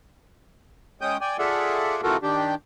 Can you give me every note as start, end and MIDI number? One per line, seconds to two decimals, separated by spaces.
1.01 1.17 56
1.01 1.17 61
1.01 1.17 79
1.01 1.17 87
1.01 1.17 91
1.21 1.37 74
1.21 1.37 79
1.21 1.37 80
1.39 2.01 65
1.39 2.01 68
1.39 2.01 69
1.39 2.01 74
1.39 2.01 76
1.39 2.01 78
2.03 2.17 48
2.03 2.17 52
2.03 2.17 65
2.03 2.17 66
2.03 2.17 69
2.03 2.17 70
2.23 2.55 51
2.23 2.55 62
2.23 2.55 67